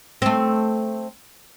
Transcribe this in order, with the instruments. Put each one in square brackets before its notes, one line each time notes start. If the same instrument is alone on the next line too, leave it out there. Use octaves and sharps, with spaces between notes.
[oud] A3 C4